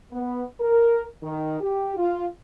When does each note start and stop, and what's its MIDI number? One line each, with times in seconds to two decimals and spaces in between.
0.13 0.44 59
0.60 1.04 70
1.23 1.58 51
1.61 1.95 67
1.97 2.26 65